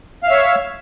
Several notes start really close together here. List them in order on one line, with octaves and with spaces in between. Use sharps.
F5 E5 C#5